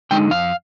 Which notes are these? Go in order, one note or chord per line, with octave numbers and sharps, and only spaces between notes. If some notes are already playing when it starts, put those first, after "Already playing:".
D3 G#3 D#4 G5
F2 F5